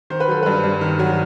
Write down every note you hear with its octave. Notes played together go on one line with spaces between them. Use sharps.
D#3 C5
B4
F#3 A4
G2 B4
G2
D#3
F#3